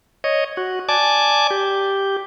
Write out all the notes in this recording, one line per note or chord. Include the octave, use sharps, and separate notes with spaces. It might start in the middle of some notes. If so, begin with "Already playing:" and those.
C#5 D#5
F#4
D5 G#5 A5 D6
G4